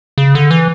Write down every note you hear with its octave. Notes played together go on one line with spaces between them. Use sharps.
C#3
D3
E3